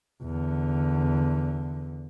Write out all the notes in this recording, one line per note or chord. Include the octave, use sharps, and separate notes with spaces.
E2 D3